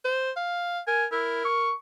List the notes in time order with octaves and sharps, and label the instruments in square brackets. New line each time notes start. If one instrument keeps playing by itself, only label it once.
[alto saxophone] C5
F5
[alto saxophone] A#4 [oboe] G#5
[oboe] E4 [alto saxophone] A#4
[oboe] C#6